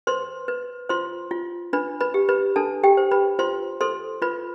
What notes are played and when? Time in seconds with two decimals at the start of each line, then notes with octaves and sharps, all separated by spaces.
0.07 B4 C5 C6
0.48 B4
0.89 F4 C5 C6
1.31 F4
1.73 D4 B4 B5
2.00 B4 B5
2.14 G4
2.29 B4 B5
2.56 D4 A4 A5
2.84 G4 G5
2.97 C5
3.11 B4 B5
3.39 F4 C5 C6
3.81 A4 C5 C6
4.22 F4 B4 B5